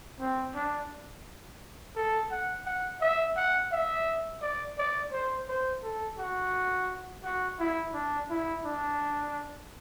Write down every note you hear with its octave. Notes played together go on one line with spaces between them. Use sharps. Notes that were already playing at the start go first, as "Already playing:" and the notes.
C4
D4
A4
F#5
F#5
E5
F#5
E5
D5
D5
C5
C5
A4
F#4
F#4
E4
D4
E4
D4